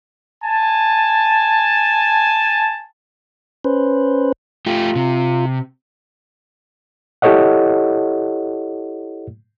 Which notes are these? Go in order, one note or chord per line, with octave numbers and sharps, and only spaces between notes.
G#5 A5
C#4 B4 C5
A3 F4 G4
C3
E4 G4 A4 C#5 D#5 F#5